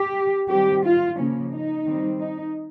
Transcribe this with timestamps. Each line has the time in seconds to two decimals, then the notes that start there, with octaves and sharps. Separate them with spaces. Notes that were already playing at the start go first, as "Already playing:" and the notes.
Already playing: G4
0.50 D#3 G3 C4 G4
0.84 F4
1.17 C#3 F3 A#3 C#4
1.50 D#4
1.85 D#3 G3 C4
2.19 D#4